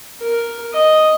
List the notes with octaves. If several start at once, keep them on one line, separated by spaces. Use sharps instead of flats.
A#4
D#5